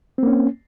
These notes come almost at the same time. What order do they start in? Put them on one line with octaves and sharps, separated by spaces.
C4 A#3 C#4